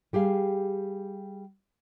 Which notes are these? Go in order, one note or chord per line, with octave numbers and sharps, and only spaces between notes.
G3 G4 G#4 F5